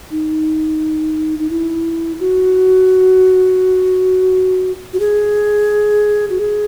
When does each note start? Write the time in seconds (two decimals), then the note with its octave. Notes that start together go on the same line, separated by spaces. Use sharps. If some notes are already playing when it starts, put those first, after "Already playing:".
0.11 D#4
1.39 D#4
1.50 E4
2.20 F#4
4.93 F#4
5.00 G#4
6.30 F#4
6.39 G#4